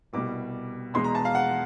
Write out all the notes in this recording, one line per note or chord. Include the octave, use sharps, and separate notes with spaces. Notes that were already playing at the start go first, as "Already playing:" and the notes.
C2 B2 G3 D6
E2 B2 G#3 C6
A#5
A5
F5
F#5